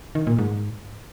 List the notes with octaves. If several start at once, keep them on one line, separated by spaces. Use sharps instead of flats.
D#3
A#2
G#2